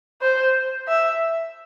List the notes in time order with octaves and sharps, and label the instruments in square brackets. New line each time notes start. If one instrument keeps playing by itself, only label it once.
[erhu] C5
E5